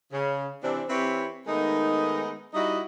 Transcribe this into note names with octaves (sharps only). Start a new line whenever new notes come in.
C#3
C3 E3 C4 D4
E3 C4 E4 G4 B4 C#5
D#3 G#3 A3 B3 D#4
G3 D#4 E4 F#4 D#5